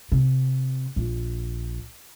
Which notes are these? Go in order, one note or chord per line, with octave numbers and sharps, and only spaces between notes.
C3
A#1